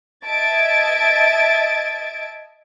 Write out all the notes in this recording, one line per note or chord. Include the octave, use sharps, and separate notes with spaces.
D#5 E5 A5 G#6 A6 D7